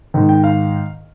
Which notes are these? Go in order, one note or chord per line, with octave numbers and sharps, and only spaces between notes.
G#2 D#3
G5
F5